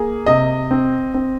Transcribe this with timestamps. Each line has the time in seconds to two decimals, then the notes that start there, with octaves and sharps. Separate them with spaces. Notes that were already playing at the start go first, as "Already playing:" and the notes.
Already playing: A#3 G#4
0.26 C3 D#5
0.71 C4
1.14 C4